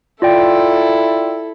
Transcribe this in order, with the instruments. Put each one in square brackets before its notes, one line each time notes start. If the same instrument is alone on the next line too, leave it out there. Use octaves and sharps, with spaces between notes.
[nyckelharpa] E4 A4 [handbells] F4 D5 G5